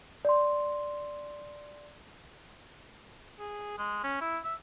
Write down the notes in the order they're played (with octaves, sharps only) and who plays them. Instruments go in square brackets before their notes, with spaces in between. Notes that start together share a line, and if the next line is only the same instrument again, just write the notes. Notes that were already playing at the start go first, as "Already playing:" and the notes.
[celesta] D5 C6
[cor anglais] G#4
G#3
C#4
E4
E5